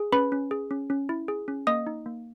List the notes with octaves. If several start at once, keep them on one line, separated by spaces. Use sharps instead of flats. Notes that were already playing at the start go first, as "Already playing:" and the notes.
Already playing: G#4
C#4 B4 B5
C#4
G#4
C#4
C#4
E4
G#4
C#4
A#3 D#5 D#6
D#4
A#3